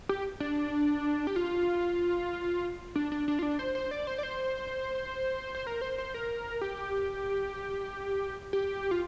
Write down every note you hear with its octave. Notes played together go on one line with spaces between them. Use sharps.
G4
D4
G4
F4
D4
D4
D4
F4
D4
C5
C5
D5
C5
D5
C5
C5
A#4
C5
C5
A#4
G4
G4
F4